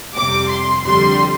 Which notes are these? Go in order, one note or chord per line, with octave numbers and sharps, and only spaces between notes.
F2 C3 G3 D6
C6
F2 D3 G3 C6